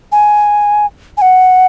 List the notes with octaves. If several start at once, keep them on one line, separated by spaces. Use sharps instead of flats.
G#5
G#5
F#5